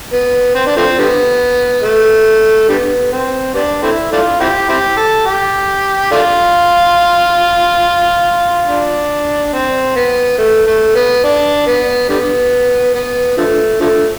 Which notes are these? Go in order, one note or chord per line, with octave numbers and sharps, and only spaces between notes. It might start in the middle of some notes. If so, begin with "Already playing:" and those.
B3
C4
D4
F3 A3 C4
D3 G3 B3
A3
D3 G3 B3
C4
G3 B3 D4
A3 C4 E4
A3 D4 F4
C4 E4 G4
C4 E4 G4
A4
G4
A3 D4 F4
D4
C4
B3
A3
A3
B3
D4
B3
D3 G3 B3
B3
D3 F3 A3
D3 F3 A3